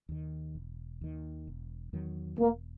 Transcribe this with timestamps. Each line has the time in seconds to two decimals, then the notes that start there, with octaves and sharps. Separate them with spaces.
0.09 D#2 D#3
0.55 E1
1.01 D#2 D#3
1.47 E1
1.93 E2 D#3 F#3
2.39 E1 A#3